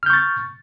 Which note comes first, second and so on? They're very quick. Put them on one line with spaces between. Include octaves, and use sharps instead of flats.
F6 G6 C#6 A6